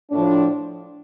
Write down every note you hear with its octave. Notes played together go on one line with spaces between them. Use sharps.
A2 F3 D4